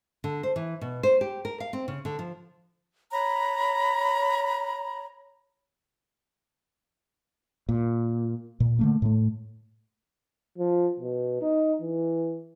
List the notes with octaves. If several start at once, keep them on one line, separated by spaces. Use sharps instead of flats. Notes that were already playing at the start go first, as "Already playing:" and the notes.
D3
C5
E3
B2
C5
G4
A#4
F5
C4
C#3
D3
F3
C#5 A#5 B5
A#2
A#2
D3 A3 A#3
A2 A3
F3
B2
D#4
E3